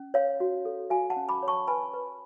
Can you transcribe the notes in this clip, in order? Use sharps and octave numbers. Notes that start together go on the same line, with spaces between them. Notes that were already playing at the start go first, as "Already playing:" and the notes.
Already playing: C#4
C#5 F5
F#4
A4
F#4 F5 G#5
F#5 A5
C#4
B5 D6
C#5
A5 C#6
B4 G#5 B5
B4